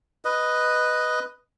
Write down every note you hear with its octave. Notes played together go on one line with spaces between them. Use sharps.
B4 D#5